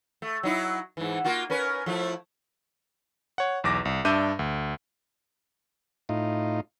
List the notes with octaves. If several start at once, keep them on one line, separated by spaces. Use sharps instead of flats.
A3
F#3 D#4 E4
G#2 E3
A#3 F4 F#4
C#4 A#4 B4
F3 A3 E4
C#5 F#5
B1 E2 D6 A#6
C2
G2 D4 E5 D6 G6 D#7
D2
A2 D#4 F4